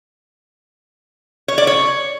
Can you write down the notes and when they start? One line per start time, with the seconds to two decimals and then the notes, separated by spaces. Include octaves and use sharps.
1.48 C#5
1.58 D5
1.67 C#5